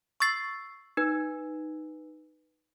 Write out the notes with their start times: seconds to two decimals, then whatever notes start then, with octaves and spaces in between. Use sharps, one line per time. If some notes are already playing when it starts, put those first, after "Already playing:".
0.20 C#6 E6 A6 C7
0.97 D#4 B4